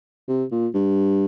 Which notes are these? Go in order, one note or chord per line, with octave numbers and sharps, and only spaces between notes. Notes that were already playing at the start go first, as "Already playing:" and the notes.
C3
A#2
G2